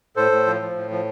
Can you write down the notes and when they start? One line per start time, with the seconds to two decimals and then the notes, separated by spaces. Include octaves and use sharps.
0.16 A2 A4 C5
0.32 A2
0.46 F3
0.61 F3
0.76 A2
0.91 F3